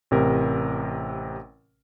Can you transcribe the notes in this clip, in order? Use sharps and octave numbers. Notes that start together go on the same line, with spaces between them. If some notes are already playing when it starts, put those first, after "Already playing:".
A1 C3 A#4